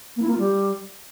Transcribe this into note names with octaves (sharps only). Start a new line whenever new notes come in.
A#3
E4
A#3
F4
G3